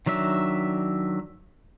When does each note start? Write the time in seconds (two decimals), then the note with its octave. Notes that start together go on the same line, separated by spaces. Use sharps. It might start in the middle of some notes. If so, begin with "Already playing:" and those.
0.06 D#3 F#3 D4 E5